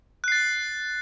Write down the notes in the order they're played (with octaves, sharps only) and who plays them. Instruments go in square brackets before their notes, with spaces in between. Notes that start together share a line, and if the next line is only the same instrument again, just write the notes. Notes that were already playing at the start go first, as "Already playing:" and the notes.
[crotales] F#6
C7
A6